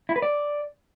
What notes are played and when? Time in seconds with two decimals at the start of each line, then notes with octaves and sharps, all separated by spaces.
0.09 E4
0.16 B4
0.22 D5